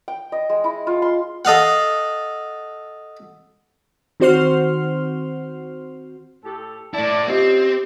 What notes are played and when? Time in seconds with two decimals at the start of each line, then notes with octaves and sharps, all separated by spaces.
0.08 G5
0.32 D#5
0.49 G#3
0.64 E4
0.87 F4
1.02 C6
1.45 A4 D#5 F5 F#5
4.20 D#3 C4 F#4 C5 C6 F6
6.44 A2 G4 A4
6.94 A3 E4 D5 A5
7.28 C4 C#4 D#4 F4 G4